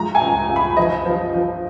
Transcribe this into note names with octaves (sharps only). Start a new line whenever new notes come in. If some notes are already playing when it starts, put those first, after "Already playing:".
Already playing: F3 G#3 A#5
G#5
C#2
C#2
B5
F3 D#5
F3
F3